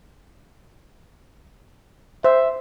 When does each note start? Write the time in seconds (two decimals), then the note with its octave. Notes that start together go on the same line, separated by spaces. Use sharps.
2.24 C5 E5